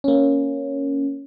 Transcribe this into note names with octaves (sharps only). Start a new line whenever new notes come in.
A#3 C#4